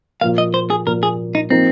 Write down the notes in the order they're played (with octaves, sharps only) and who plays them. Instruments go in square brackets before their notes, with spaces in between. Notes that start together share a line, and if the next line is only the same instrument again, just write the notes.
[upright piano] A#2 F3 A#3 [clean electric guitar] F5
[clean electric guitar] D#5
C5
G#4
[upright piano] A#2 F3 A#3 [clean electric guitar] A#4
[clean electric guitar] G#4
D#4
[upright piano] F3 A#3 D#4 [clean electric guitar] C4